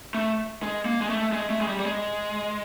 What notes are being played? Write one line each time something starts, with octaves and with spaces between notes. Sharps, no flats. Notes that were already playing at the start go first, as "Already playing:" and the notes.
A3
G#3
A#3
G#3
A3
G#3
A3
G#3
G3
G3
G#3